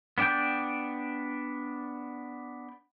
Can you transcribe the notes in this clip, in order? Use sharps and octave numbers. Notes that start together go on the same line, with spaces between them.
B3 D4 D5 G5 G6